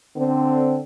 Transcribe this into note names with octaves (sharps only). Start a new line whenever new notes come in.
D3 C4